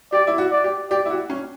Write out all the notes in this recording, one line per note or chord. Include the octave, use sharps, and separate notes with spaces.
G4 D5
E4
F#4
D5
G4
G4 D5
E4
F#4
C#4